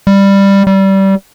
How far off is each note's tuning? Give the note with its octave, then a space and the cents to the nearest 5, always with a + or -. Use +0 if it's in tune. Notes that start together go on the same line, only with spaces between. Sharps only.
G3 +10
G3 -20